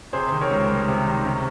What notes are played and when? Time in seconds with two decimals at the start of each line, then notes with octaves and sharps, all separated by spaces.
0.13 C3 G#4 C5
0.32 D#3
0.41 A#4 C#5
0.51 C#2
0.70 G3
0.88 C3
1.06 D#3
1.26 C3